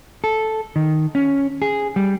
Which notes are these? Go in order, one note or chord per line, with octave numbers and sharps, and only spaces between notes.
A4
D#3
C#4
G#4
G3